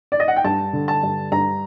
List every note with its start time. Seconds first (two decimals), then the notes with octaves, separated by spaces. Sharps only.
0.12 D5
0.20 D#5
0.28 F#5
0.36 G5
0.44 G2 A5
0.73 D3
0.88 A5
1.03 G2
1.32 G2 A#5